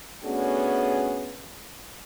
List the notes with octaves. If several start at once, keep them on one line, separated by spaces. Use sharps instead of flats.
A3 B3 C#4 D4 F#4 G#4